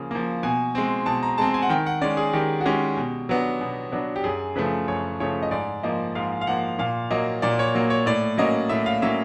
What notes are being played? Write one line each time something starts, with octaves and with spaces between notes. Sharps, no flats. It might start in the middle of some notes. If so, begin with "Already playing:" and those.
Already playing: C#3 F3 A#3
F3 A#3
B2 G#5
G#3 C4
B2 A5
A#5
G#3 C4 A5
G#5
F#5
D#3 G5
F#5
G#3 C#4 D5
G#4
D#3 G4
F#4
G#3 C#4 G4
B2
F#3 B3 D4
B2
F#3 B3 D4
G4
F#2 G#4
C#3 F3 A3 B4
F#2 C#5
C#3 F3 A3 C#5
D#5
G#2 D5
F3 A#3 D#5
G#2 F5
F5
F3 A#3 F#5
A#2 F5
F#3 A#3 D#5
A#2 D5
C#5
F#3 A#3
C#5
A2 D5
F#3 A#3 C#4 D#5
A2 E5
F5
F#3 A#3 C#4 E5